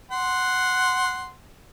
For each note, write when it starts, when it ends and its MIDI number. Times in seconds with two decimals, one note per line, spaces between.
0.11 1.32 78
0.11 1.32 84